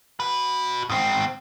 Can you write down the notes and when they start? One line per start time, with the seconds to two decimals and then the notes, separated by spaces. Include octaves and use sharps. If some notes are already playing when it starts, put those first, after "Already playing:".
0.20 F#4 B5
0.90 G#2 C4